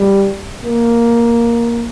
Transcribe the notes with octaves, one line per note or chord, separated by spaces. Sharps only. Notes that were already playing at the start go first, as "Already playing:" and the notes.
Already playing: G3
A#3